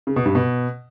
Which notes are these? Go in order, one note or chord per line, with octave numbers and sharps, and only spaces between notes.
C#3
B2
G2
B2